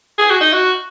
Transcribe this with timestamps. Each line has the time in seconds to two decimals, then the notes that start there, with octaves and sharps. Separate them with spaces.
0.18 G#4
0.30 F#4
0.41 D#4
0.53 F#4